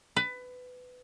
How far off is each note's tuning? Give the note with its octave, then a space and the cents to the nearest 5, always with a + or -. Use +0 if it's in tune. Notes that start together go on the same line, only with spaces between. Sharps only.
B4 +20